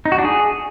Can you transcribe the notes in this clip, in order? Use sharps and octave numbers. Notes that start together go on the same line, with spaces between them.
D#4
F#4
D4
G#4